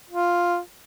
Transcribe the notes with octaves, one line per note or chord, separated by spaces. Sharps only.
F4